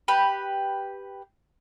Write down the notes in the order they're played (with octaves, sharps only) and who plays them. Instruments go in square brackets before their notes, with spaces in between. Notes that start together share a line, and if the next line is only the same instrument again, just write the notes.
[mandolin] G4 B4